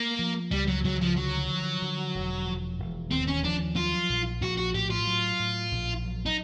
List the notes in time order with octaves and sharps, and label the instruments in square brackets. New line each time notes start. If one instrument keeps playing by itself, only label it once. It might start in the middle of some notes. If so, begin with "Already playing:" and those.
Already playing: [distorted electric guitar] A#3
[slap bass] F3
[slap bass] C#2 [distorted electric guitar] G3
[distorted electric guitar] F#3
[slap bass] C#2 [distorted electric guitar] F#3
[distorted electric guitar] F3
[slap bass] D3 [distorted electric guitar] F#3
[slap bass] F3
D3
E1
F3
E1
[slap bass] D#2 [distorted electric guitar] C4
[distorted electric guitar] C#4
[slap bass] F3 [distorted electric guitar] D4
[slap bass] F#3 [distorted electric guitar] F4
[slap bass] A#1
[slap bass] A#1 [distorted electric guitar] F#4
[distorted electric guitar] F#4
[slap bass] A2 [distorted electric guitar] G4
[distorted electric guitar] F4
[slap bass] F#3
A2
A#1
F#3
[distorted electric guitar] D#4